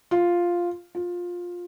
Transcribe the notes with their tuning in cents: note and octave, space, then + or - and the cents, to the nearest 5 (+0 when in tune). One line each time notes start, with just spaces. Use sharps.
F4 +0
F4 +15